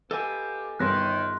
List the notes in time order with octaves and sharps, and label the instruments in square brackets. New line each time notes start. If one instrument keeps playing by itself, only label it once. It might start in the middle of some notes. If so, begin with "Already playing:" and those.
[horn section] B3 F4 G4 [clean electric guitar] A4 D#5 G#5
[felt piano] G1 B3 A#6 [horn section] D#3 [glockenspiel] C6 F#6